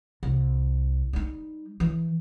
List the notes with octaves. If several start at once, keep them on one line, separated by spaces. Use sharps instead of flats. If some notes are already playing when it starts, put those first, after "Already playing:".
C2
G3 D#4
E3